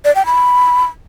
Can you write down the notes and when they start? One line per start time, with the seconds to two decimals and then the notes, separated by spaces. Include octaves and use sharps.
0.05 D5
0.15 G5
0.26 B5